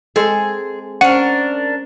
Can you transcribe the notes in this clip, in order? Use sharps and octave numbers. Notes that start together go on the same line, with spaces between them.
G#3 C4 G#4 A4
C#4 D4 A#4 C5 F#5